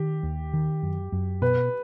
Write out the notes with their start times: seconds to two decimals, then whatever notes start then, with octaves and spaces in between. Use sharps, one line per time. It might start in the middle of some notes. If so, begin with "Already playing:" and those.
Already playing: D#3 G4
0.23 D#2
0.53 D#3
0.83 F#2
1.12 F#2
1.42 B2 B4